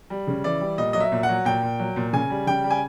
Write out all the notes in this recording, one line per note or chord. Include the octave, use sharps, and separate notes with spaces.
G3
C#3
E3 D5
G3
A#2 D#5
F#3 D#5
E5
A#2
F#5
F#3
A#2 G5
A#2
F#3
A#2
C#3 G#5
G3
C#3 G5
G3
G#5